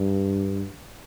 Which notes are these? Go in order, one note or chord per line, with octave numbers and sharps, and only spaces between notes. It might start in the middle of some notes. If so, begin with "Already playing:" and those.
Already playing: G2